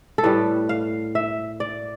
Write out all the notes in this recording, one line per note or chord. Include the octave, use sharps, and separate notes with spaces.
A4
A2 G3 B4
F5
E5
D5